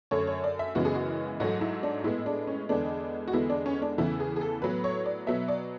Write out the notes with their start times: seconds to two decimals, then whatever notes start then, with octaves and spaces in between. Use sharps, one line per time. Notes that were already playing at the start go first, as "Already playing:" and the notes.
0.11 F#2 D3 A3 C#5
0.27 C#5
0.44 D5
0.59 E5
0.75 F#2 C#3 E3 G#3 B3 F#4
0.85 G#4
0.95 F#4
1.40 G#2 F#3 A3 F#4
1.61 E4
1.83 D4
2.04 A2 G#3 B3 E4
2.26 D4
2.47 C#4
2.69 E2 D3 G#3 B3 D4
3.28 F#4
3.33 E2 D3 G#3 B3 E4
3.50 D4
3.66 C#4
3.82 D4
3.98 E2 C#3 E3 A3 E4
4.20 G#4
4.36 G#4
4.41 A4
4.62 A2 F#3 B3 B4
4.84 C#5
5.05 D5
5.27 B2 F#3 B3 E5
5.48 D5